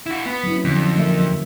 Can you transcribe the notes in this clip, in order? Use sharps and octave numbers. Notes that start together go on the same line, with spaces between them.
E4 F#4
B3
F#3 C#4 E4
F2 D3
F#3 A#3 E5
E3